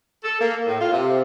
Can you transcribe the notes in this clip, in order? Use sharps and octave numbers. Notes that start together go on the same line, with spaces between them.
A4
A#3
A2
F4
C3